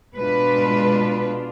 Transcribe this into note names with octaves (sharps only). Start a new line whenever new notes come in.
B2 G#3 D4 F4 B4